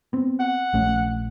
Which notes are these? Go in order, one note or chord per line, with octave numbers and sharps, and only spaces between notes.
B3 C4
F#5
A#1 A3 C#4